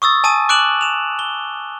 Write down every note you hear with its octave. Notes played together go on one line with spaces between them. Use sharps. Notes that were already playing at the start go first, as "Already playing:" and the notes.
C#6 D#6 E6 A6
G#5 A5 D#6 D#7
D6 F#6 D7 E7 F#7
E7 F7
G7